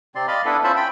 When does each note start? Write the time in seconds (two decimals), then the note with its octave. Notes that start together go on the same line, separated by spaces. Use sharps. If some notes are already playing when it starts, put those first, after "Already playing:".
0.15 C3 C4 D5 C6
0.28 D5 D#5 F5 B5 C6
0.46 B3 D4 E4 A4 B4
0.64 C#4 F4 C5 E5 A5 B5
0.76 G5 B5